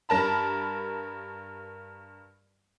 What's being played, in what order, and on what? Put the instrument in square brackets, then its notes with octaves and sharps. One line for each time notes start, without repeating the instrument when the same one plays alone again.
[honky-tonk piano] G2 A#4 A5 B5